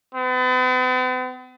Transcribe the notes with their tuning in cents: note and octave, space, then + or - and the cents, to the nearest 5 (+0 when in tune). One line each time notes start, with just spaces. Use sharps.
B3 +45